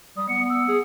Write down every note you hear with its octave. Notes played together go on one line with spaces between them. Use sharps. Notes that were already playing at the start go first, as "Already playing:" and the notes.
G3 D#6
B3 C#7
E6
G#4 D#6